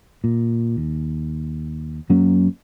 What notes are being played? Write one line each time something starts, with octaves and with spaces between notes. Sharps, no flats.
A#2
D#2
F#2 F#3 A#3 C#4